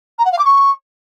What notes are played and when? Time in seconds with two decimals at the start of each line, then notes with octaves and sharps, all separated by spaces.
0.19 A#5
0.25 F#5
0.32 F5
0.39 D6
0.45 C#6